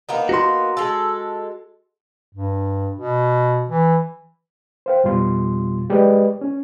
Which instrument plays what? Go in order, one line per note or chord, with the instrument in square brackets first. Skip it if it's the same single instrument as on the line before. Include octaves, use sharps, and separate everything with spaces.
[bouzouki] A#3 B3 D#4
[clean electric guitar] F#4 C6
[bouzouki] G#3 A4
[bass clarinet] G2
B2
E3
[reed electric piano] C5 F5 G5
F2 B2 G3 F4 C6
G#3 G4 G#4 B4 D5 D#5
C#4